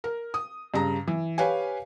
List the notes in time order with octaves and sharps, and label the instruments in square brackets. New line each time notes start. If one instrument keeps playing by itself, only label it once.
[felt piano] A#4
D#6
G2 C#3 A#5
E3
G4 B4 C#5 F5 G#5